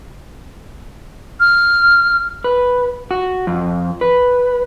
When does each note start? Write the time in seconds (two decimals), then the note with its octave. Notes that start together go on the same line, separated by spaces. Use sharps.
1.40 F6
2.44 B4
3.11 F#4
3.47 F2
4.01 B4